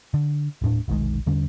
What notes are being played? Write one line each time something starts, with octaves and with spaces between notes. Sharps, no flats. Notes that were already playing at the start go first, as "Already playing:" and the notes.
D3
D#1 A2 D4
F1 B1 D#3 G#3
E2 D3 G3 C#4